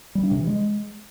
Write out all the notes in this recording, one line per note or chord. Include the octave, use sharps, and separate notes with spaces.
G3
D4
C3
E3
G#3